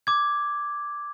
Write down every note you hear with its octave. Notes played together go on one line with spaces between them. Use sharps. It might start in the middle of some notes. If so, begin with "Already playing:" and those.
D6 G#6